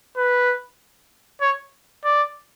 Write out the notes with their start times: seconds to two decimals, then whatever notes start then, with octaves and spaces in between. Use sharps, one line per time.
0.17 B4
1.41 C#5
2.04 D5